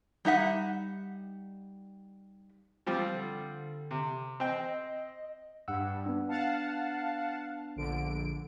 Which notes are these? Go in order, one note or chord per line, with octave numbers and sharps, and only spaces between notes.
G3 D#4 E5 F#5
F3 G3 C4
D3
C3
C4 D#5 G5
G2 F#5 E6
B3 D4
F5 F#5 A5
A#1 D3 D7